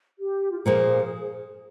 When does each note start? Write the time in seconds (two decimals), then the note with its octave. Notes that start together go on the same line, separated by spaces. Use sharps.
0.19 G4
0.51 F4
0.58 G4
0.65 A#2 F3 A#3 G#4